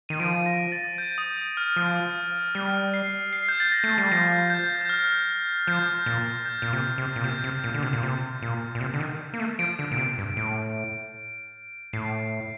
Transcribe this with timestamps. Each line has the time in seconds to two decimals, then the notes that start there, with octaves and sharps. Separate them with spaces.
0.09 D#3 D#7
0.20 F3 D7
0.46 A#6
0.72 A6
0.98 G6
1.18 D#6
1.38 D#6
1.57 F6
1.76 F3 D#6
2.55 G3 F6
2.94 C7
3.33 C7
3.48 G6
3.60 A6
3.72 A#6
3.84 A3
3.98 G3
4.12 F3 A#6
4.50 G6
4.81 G6
4.89 F6
5.67 F3 G6
6.06 A#2 A6
6.45 G6
6.62 A#2
6.73 C3
6.98 C3
7.16 A#2
7.24 C3 G6
7.44 C3
7.64 A#2
7.74 D3
7.83 C3
7.93 A#2
8.03 C3
8.42 A#2
8.75 A#2
8.81 C3
8.93 D3
9.00 D#3
9.33 A#3
9.40 A3
9.59 F3 D7
9.79 D3
9.92 A#2
9.98 C3
10.18 G2
10.37 A2
11.93 A2 C7